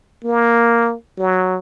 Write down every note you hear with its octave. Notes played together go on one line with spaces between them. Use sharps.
A#3
F#3